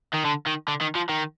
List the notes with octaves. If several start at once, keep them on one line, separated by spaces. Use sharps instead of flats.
D#3
D3
D#3
D3
D#3
F3
D#3